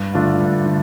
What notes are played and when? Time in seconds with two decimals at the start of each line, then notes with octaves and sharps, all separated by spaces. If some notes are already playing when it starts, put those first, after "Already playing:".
Already playing: G2
0.14 D3 A3 D4 F4
0.40 G2
0.66 D3